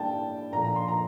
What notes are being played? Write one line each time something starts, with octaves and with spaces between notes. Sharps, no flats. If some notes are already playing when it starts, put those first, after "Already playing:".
Already playing: A2 G3 A#3 G5 A5
A#2 F3 A3 A#5
A#5
C6
A#5